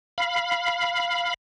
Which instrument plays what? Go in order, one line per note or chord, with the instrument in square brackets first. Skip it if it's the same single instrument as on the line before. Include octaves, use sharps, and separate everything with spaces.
[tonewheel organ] F5 B5